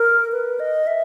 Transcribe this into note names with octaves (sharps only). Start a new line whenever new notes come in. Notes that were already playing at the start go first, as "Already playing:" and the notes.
Already playing: A#4
B4
D#5
E5